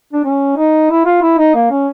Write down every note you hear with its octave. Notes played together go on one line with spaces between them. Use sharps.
D4
C#4
D#4
E4
F4
E4
D#4
A#3
C#4